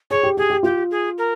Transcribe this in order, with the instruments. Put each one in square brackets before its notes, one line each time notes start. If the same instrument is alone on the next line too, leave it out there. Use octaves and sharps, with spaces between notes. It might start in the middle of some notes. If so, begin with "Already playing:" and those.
[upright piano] G#4 [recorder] C#5
[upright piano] G4
[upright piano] G4 [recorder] G#4
[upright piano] G4
[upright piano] F4 [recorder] G4
[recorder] G#4
A#4